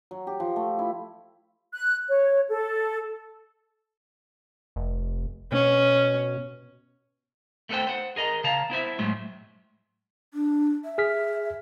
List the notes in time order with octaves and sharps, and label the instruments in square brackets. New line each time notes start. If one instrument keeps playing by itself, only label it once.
[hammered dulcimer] F#3
G4
F3
A3
E4
[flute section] F#6
C#5
A4
[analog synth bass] F1
[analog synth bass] B2 [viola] C#4
[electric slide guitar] A3 B3 A4 B4 C5 G5
C5 F#5
G#4 A#4 D#5 A#5
C#3 F5 A5 A#5
B3 E4 C5 E5
A2 F#3 G#3
[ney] D4
E5
[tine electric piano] G#4 F6 B6